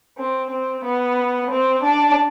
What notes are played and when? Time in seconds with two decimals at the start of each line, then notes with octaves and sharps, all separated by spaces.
0.18 C4
0.50 C4
0.84 B3
1.50 C4
1.83 D4